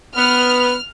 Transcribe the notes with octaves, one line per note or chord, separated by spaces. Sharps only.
B3 F6